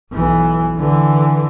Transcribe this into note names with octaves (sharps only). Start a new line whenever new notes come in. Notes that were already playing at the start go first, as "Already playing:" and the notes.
B1 E3
D3 E3